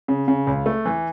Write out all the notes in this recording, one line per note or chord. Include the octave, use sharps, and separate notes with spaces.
C#3
C#3
C#2
A3
E3